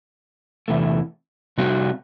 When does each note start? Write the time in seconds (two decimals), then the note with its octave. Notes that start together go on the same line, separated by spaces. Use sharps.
0.68 E2 C3 E3 A3
1.58 C3 G3 C4 F#4